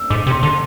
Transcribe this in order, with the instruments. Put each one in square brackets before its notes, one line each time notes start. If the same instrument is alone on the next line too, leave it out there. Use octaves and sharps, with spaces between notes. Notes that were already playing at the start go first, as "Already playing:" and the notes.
Already playing: [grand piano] E6
[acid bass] G#2 [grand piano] D6
[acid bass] C3
[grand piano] C6
[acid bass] D3